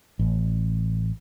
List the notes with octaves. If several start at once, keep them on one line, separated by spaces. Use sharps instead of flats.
A1